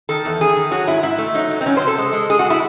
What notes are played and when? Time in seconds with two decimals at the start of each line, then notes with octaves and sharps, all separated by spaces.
0.09 D#3 A4
0.25 E2
0.41 D#3 G#4
0.57 D#3
0.71 F#3 F#4
0.87 G#2 E4
1.03 G#2 E4
1.18 A3
1.34 F#3 D#4
1.50 F#3
1.61 C4
1.66 F#3 C#4
1.77 C5
1.81 C3
1.88 A4
1.98 G#3
2.13 G#3
2.30 G#3 G#4
2.39 F#4
2.50 E4